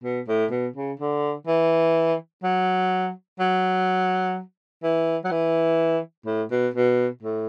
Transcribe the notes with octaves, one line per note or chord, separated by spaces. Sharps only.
B2
A2
B2
C#3
D3
E3
F#3
F#3
E3
F#3
E3
A2
B2
B2
A2